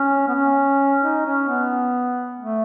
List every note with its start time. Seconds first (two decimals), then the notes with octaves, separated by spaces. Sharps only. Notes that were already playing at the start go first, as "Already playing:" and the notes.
Already playing: C#4
0.28 B3
0.34 C#4
1.03 D#4
1.26 C#4
1.48 B3
2.39 A3